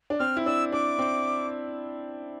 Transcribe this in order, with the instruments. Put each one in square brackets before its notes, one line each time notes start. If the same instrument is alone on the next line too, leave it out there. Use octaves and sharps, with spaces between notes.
[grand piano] D4
[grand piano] C4 [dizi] F6
[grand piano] E4
[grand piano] D4 [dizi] E6
[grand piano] D4 [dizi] D6
[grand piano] C4